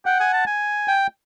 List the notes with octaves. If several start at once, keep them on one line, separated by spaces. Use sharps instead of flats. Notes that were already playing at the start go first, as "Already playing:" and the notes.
F#5 G5
G#5
A5
G#5
G5